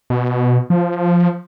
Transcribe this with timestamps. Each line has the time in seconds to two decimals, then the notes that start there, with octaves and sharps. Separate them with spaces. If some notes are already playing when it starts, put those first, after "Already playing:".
0.10 B2
0.70 F3